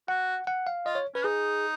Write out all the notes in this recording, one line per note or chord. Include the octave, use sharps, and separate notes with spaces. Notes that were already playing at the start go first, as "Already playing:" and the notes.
F#4 F#5
F#5
F5
F4 D#5
C#5
C#4 B4
D#4 G#4